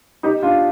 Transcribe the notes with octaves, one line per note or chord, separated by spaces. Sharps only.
D#4 G4
D4 F4